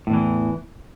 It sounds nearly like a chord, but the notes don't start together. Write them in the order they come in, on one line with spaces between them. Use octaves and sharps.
A2 E2 E3